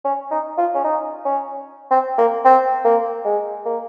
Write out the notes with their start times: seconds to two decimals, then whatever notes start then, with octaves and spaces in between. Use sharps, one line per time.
0.05 C#4
0.31 D#4
0.58 F4
0.75 C#4
0.84 D#4
1.25 C#4
1.91 C4
2.18 A#3
2.45 C4
2.85 A#3
3.25 G#3
3.65 A#3